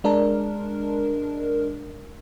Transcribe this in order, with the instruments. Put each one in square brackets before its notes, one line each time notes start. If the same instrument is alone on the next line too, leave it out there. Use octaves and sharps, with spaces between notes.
[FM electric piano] G#3 D4 A#4